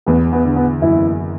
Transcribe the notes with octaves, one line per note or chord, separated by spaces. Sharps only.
E2 B3
B3
D3
B3
F#1 E4